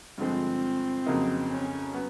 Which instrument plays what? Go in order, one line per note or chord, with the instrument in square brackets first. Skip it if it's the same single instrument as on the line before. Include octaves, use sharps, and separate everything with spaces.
[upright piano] G2 D3 F3 G#3 [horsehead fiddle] C4
[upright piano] F2 C#3 F#3 A#3 D#4
[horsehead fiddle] C#4
[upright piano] F#3 B3